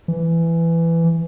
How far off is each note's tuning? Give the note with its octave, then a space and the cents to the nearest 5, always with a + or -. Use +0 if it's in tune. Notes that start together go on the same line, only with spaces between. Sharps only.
E3 +15